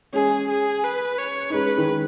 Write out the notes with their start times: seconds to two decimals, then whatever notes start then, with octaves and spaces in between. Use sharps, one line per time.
0.13 G#3 C#4 G#4
0.49 G#4
0.84 B4
1.19 C#5
1.50 D#4
1.54 G#3 C#4 B4
1.77 D#3 G#3